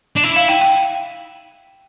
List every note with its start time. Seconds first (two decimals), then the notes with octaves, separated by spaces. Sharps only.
0.16 D4
0.24 E4
0.36 F5
0.49 G5
0.61 G5